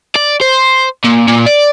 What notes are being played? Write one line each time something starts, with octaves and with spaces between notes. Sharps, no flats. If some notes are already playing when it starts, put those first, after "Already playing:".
D5
C5
A#2
A#2
D5